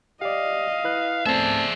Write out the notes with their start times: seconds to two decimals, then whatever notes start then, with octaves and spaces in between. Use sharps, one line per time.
0.22 G4 D5 D#5 F5
0.84 E4 B4 F#6
1.26 A3 B3 C4 G#4 C5 D5 E5 A5